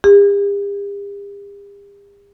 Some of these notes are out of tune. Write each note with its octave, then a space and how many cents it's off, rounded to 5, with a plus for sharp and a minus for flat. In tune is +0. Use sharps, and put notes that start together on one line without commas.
G4 +45